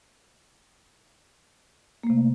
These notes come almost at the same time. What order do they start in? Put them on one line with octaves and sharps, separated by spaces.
A#3 A3 C3